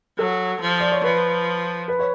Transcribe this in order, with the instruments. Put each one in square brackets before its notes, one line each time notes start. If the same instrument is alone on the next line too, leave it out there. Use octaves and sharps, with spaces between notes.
[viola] F#3 [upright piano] A4
[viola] F3
[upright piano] D5
C#5
[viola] F3 [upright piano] B4
[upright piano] B4
C#5